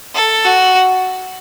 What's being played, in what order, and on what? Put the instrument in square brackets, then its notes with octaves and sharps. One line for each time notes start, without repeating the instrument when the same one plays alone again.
[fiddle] A4
F#4